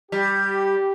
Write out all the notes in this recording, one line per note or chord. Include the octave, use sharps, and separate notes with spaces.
G3 G4